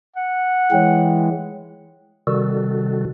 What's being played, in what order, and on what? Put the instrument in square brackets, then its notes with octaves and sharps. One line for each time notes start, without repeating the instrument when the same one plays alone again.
[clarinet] F#5
[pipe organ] E3 G#3 [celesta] C#5 G5
[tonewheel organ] C3 D#3 G3 F#4 A4